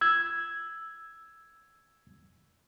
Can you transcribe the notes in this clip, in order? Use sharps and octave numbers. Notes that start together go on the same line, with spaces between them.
E6 G#6